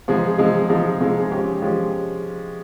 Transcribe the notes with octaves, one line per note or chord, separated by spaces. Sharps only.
C3 F3 G#3 D#4 G#4
C3 F3 G#3 D#4 G#4
C3 F3 G#3 D#4 G#4
C3 F3 G#3 D#4 G#4
F3 G#3 C#4 G4
F3 G#3 C#4 G4